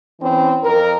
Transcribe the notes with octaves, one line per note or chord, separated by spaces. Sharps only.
E2 E3 C4 C#4
F2 A#4